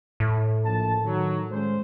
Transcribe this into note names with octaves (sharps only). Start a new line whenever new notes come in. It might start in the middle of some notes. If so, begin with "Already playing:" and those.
A2
A#1 A5
D#3 F#3
G#3 C#4 C5